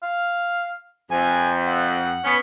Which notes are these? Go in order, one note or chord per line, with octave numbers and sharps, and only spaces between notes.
F5
F2 G#5
F#5
B3 C#4